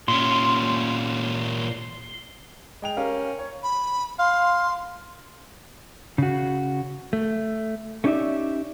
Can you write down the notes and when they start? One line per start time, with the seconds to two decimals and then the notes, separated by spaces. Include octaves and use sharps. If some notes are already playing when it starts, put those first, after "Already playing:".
0.08 A#2 C#4 C6
2.82 G#3 G5 F7
2.97 C#4 G4 A#4 F5
3.39 C#5
3.63 B5
4.19 F5 C6
6.18 C#3 F#4
7.13 A3
8.04 A3 C#4 D#4 G4 D5 E5